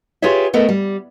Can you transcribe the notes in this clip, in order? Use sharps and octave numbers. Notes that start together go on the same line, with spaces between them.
F4 G4 G#4 B4 C#5 E5
A3 B3 A4 A#4 D#5
G3